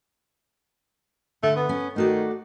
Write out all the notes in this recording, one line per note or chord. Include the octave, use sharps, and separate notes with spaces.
D3 A3
B3
C#4
D#3 A3 F#4 D5